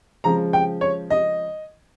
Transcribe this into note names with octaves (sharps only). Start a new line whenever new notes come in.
C#3 F3 G#3 A#5
G5
C#5
D#5